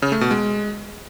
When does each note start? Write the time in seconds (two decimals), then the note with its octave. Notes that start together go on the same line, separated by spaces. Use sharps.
0.02 C#3
0.12 A3
0.21 B2
0.31 G#3